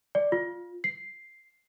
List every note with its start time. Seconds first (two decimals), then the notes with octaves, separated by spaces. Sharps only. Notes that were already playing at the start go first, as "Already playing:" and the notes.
0.15 D5
0.32 F4
0.84 C7